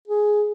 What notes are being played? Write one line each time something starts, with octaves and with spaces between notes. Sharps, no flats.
G#4